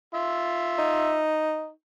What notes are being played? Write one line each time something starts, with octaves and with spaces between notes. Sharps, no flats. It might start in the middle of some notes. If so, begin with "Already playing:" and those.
F4 E5
D#4